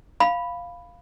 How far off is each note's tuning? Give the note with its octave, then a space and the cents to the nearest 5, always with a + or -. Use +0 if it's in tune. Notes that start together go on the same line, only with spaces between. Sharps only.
F5 +0 B5 +0